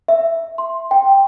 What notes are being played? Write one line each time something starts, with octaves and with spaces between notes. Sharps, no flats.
E5
C6
G5